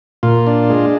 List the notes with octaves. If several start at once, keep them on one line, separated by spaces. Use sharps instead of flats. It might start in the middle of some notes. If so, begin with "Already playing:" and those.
A#2 F4
D4
G#3